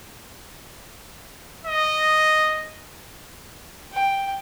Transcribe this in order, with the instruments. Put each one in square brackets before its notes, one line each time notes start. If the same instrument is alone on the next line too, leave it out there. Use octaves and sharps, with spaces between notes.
[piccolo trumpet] D#5
[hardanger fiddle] G5